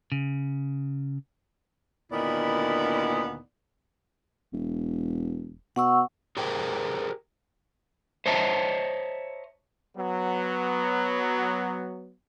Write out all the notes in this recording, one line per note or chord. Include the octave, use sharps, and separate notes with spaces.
C#3
D2 A#2 D#3 B3 E4 D5
E1
B2 F#5 C#6 E6
G4 G#4 A#4 C5 G5
C5 C#5 D#5 E5 A5 A#5
F#3 B3